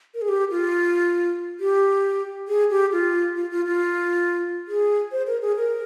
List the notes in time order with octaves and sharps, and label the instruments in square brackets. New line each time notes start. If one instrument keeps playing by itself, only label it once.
[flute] A#4
G#4
G4
F4
G4
G#4
G4
F4
F4
F4
F4
G#4
C5
A#4
G#4
A#4